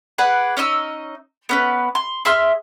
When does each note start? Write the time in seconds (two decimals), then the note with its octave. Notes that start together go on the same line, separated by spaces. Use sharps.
0.18 G#4 B4 D5 F#5
0.57 C#4 D#4 D#5 E6
1.49 B3 C#4 B4
1.95 C6
2.25 G#4 E5 C6 F6